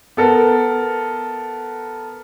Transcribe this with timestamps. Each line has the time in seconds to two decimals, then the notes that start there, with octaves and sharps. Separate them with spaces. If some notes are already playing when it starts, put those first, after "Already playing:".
0.17 B3 A4 A#4